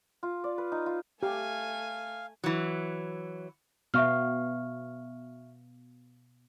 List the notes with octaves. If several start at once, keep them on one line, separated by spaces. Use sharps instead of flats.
F4
D5
B4
D#4
F4
A3 G4 F5 G#5
E3 F#3
B2 B3 E5 F5 C#6 F6